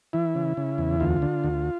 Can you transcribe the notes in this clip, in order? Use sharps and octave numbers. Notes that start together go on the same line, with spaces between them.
E3 E4
C#3
C#3
E2
D2 F4
D3
D2